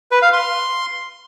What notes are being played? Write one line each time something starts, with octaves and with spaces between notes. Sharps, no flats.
B4
F5
C6